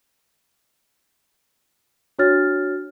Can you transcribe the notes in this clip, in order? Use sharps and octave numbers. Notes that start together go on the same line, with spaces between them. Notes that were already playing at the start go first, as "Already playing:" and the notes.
D4 F#4 C#5 F6 A6